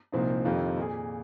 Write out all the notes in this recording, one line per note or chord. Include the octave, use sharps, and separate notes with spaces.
C2 A#2 F3 C4 D#4
F2 C3 D#3 C4 F4
A#2 A#3 G#4